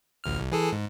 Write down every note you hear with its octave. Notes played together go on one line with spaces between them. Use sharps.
A1 D2 F6
C2
E3 G#4 A4
G#2